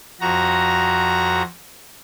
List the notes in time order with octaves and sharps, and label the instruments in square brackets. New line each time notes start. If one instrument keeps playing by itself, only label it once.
[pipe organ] F2 F#4 A#5